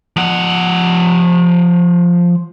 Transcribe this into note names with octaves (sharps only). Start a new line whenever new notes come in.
F3 F#5